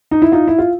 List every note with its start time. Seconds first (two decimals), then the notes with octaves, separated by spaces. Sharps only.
0.11 D#4
0.22 E4
0.32 D#4 F4
0.48 E4
0.58 F4